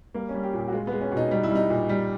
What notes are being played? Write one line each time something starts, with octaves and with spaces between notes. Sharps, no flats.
G3 A#3
C#4
G3
G4
A#2 G4
F#4
G#3 F4
G#3 B3
C#4
B2
D#4
G3 D#4
E4
G3 D#4
A#2
G3